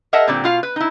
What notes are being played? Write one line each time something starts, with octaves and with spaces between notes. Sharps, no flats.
G#4 A#4 D#5 E5 F#5 A5
A#2 D3 G3 C4 D5
B2 F4 F5
B4
D#4 E4